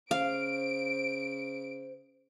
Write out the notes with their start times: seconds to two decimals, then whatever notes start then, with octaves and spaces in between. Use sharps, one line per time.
0.11 C#3 C5 F5 D7